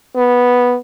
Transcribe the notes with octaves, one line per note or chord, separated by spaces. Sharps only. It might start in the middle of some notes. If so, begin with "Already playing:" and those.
B3